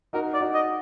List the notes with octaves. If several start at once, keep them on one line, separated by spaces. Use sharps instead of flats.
D#4 F#4 A#4
D5
D#4 F#4
D#5